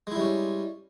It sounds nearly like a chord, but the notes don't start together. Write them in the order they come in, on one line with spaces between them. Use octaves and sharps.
G#3 E4 G3 C#4